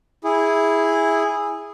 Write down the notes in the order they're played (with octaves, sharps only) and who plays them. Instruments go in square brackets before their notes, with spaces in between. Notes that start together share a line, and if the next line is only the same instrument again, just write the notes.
[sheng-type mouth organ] E4 G#4